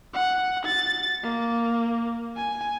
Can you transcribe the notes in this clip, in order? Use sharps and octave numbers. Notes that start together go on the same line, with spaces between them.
F#5
A6
A#3
G#5